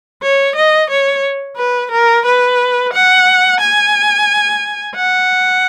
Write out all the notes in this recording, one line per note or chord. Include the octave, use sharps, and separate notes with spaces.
C#5
D#5
C#5
B4
A#4
B4
F#5
G#5
F#5